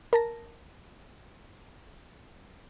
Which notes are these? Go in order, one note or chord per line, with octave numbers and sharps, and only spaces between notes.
A#4 A5 A#6